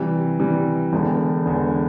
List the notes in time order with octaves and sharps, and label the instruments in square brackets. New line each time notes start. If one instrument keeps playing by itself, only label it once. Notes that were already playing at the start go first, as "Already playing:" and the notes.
Already playing: [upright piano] C3 E3 G3
C3 E3 G3
E1 E2 D3
E1 E2 D3